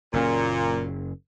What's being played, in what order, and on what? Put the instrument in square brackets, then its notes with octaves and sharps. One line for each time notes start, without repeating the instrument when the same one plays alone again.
[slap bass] F#1 C#4 [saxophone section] A#2